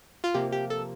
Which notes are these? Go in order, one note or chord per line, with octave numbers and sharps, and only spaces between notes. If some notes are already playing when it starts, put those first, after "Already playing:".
F4
C3 F3 A#3 G4
G4
A4